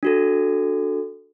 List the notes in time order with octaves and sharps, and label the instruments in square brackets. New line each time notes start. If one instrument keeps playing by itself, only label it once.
[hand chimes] D4 F#4 A4